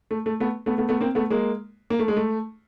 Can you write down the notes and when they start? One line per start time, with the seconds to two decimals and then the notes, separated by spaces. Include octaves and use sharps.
0.11 A3
0.26 A3
0.40 A3 B3
0.66 A3 B3
0.78 A3 B3
0.89 A3 B3
1.00 A#3 C4
1.15 A3 B3
1.30 G#3 A#3
1.90 A#3
1.99 A3
2.08 G#3
2.16 A3